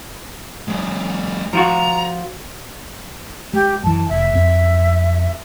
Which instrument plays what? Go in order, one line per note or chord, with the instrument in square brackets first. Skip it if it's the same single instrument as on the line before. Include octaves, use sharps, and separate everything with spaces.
[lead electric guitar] F#3 G#3
[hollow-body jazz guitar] F3 F4 F#4 [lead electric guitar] A#5
[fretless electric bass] G#3 [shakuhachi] G4
[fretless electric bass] F#2 E3 [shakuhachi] A5
[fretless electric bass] F1 [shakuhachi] E5
[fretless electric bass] F2 C4